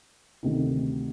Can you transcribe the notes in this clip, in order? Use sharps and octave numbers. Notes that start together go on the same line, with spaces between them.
D2 C3 D#3